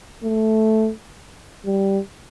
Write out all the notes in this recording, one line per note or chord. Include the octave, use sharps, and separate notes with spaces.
A3
G3